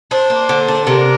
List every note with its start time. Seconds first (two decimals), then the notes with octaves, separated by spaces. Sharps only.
0.11 D4 C5
0.30 A#3
0.49 D3
0.68 D4
0.86 C3 A#4